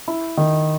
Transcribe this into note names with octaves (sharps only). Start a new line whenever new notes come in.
E4
D#3